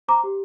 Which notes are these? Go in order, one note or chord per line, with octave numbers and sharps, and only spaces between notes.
C5 A#5 D6
G4